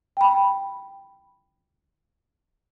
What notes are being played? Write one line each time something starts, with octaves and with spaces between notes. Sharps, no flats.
G5 B5